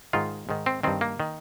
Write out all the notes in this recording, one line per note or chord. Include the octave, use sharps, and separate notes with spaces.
G#2 D#3 F4
G#2 D#3
C4
G2 D#3 C4
A#3
D#3